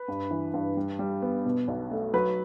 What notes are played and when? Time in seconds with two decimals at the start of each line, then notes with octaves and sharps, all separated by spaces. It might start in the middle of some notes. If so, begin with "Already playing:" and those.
Already playing: B4
0.08 G2
0.30 E3
0.54 G2
0.77 G3
0.99 G3
1.22 B3
1.45 B2
1.68 B1
1.91 A3
2.13 F#3 B4